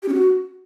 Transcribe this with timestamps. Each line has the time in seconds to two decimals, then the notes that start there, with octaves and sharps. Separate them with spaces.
0.03 G4
0.08 C#4
0.14 F#4